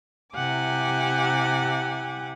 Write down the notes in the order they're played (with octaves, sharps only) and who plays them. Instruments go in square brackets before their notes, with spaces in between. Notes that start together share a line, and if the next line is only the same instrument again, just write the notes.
[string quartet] C3 E4 G4 F#5 G#5 D6